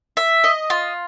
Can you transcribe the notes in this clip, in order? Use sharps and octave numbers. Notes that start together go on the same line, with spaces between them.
E5
D#5
F4